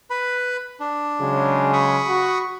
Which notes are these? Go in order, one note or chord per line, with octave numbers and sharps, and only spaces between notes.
B4 B5
D4
C#3 F#3 G#3
B5 C#6 D#6
F#4